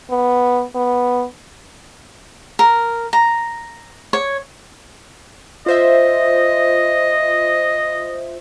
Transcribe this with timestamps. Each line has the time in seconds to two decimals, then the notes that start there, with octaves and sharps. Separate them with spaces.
0.11 B3
0.75 B3
2.59 A#4
3.13 A#5
4.13 C#5
5.66 F4 C5 D#5 E5